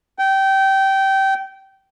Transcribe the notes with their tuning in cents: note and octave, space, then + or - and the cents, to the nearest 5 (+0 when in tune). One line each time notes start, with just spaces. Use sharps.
G5 -20